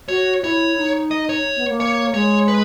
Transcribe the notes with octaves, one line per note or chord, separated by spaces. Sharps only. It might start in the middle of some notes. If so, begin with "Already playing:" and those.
F#4 C#5
E4 C#5
D#4
D#5
C#5
B3
A#3
C#5
G#3 C#5
B4